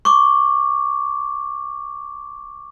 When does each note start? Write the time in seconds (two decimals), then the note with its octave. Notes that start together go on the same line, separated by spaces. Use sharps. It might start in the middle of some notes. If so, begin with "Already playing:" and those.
0.05 C#6 D6